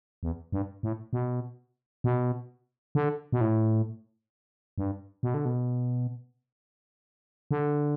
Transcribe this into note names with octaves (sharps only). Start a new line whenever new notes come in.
E2
G2
A2
B2
B2
D3
B2
A2
G2
B2
D3
B2
D3